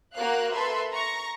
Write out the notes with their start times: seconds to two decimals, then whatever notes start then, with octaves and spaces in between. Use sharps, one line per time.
0.15 A#3 F#4 A#4 F5 F#6
0.53 A4 B4 E5 C6
0.93 A#5 C#6 A#6